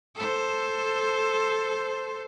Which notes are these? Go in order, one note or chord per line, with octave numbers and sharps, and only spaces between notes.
A4 C5